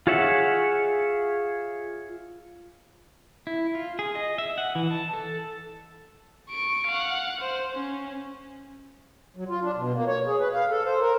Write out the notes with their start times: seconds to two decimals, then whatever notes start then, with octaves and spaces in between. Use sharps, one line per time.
0.07 F4 G#4 C#5 E5 F#5
3.47 E4
3.75 F4
3.99 G#4
4.15 D#5
4.38 E5
4.58 F#5
4.75 E3
4.91 A5
5.13 A4
6.50 C#6 D7
6.87 F5 F#5
7.41 C5
7.74 C#4
9.36 F#3
9.48 F4
9.63 D4
9.76 B2
9.94 A#3
10.07 C#5
10.26 G#4
10.40 B4
10.54 F5
10.69 A4
10.85 C5
11.00 A#4